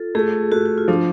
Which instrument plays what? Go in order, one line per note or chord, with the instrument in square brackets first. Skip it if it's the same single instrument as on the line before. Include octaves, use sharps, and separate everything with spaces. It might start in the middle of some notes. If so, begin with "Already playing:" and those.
Already playing: [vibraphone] F4 A4
[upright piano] A3 [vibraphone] G#4
[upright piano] A3 [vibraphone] F#4
[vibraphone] F#4
F4
[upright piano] F3 [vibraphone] D4